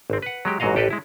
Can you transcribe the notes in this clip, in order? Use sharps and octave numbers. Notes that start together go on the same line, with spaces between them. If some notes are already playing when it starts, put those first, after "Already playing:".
G#1 C4
B4 F#5
F#3 G#3 G4
A1 G#2 F#3 F#4 D#5 F5
A1 G4 A4 B4 D#5
G#3 E4